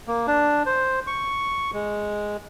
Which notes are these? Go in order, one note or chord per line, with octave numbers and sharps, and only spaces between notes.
A#3
D4
C5
C#6
G#3